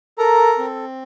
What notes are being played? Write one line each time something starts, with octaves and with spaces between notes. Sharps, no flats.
A4 A#4 A#5
C4